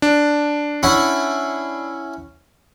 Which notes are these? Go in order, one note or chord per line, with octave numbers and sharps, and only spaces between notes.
D4
C#4 E4 F#5